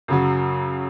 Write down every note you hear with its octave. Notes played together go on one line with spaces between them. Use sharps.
F#2 C#3 F#3